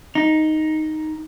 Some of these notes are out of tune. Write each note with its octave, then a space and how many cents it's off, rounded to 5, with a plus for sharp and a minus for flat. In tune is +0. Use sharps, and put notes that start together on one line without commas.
D#4 +0